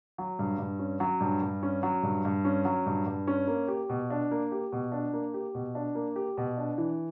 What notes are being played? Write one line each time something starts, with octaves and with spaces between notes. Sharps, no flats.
F#3
G2
G2
C#4
F#3
G2
G2
C#4
F#3
G2
G2
C#4
F#3
G2
G2
C#4
A#3
G4
B2
D4
A#3
G4
B2
D4
A#3
G4
B2
D4
A#3
G4
B2
D4
E3